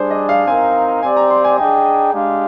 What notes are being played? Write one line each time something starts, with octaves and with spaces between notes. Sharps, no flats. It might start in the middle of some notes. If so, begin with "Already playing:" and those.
Already playing: G3 D4 G#4 C5 D5
D#5
F5
C4 D#4 A#4 G#5
C4 G4 D5 G#5
A#5
C6
G#5
D4 G#4 D#5 G5
G#3 D4 G4 D5 F5